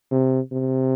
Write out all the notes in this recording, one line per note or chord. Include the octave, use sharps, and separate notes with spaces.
C3
C3